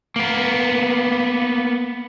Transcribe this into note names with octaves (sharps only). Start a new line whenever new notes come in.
A#3 B3